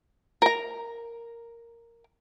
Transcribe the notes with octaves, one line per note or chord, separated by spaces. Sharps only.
A#4 A#5